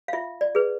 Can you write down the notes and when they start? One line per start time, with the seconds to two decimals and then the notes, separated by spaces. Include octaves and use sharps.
0.08 F5
0.13 F4 E5
0.41 D5
0.55 G#4 B4